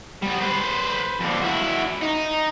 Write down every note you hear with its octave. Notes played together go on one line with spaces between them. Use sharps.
G3 B3
B4 C5
F2 D3
E4 F#4
D#4